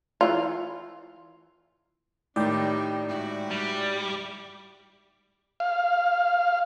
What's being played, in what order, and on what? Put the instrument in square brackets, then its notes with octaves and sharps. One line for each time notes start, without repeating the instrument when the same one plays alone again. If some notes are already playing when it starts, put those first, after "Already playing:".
[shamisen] E3 F4
[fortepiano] A2 D#3 [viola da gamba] G3 D4 D#4 [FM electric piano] D5 G5
[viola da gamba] G#2 E4 F#4
[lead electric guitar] G3
[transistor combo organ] F5